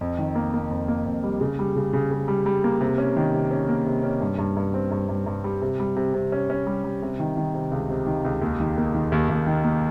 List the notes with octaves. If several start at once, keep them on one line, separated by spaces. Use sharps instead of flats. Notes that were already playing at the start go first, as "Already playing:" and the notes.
F2
D#3
A#3
A#3
F2
A#3
F2
G3
C#3
G3
C#3
C#3
C#3
G3
G3
A#3
C3
C#4
D#3
C3
C#4
A#3
C3
C#4
G2
G2
G2
C4
G2
G2
G2
G3
C3
G3
C3
C3
C#4
C#4
G3
G3
C3
D#3
D#3
C3
C#2
C3
D#3
C#2
D#2
D#3
A#3
D#3
D#2
D#2
D#3
A#3